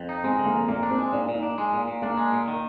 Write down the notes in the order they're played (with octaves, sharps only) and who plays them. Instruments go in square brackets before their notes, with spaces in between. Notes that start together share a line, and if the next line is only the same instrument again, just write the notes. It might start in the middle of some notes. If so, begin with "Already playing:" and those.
Already playing: [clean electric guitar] F2
D#4
[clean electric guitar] G#3 [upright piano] C4
[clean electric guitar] D3
[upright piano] A#3
[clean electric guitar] F2
[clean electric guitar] A#2 [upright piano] A#3
[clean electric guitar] D4
[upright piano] C4
[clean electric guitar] G#3
[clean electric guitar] A#2 [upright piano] D4
[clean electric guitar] A#2
[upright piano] D#4
[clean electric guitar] D4
G#3
A#2
A#2
[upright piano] A#3 [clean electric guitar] D4
[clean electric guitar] G#3
A#2
D#3